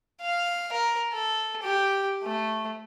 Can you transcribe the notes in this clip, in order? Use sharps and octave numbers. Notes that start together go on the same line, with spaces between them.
F5
A#4
A4
G4
A3